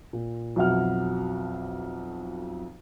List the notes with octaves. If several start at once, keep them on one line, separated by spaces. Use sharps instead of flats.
A#2
B1 F2 F#3 E5 F#5 F6